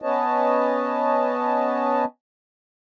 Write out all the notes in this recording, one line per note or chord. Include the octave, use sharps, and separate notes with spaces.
B3 C#4 B4 C#5 D#5 A5